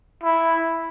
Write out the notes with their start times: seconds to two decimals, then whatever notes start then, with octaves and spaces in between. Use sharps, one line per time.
0.23 E4